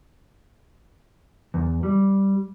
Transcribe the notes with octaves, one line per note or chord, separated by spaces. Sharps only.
E2
G3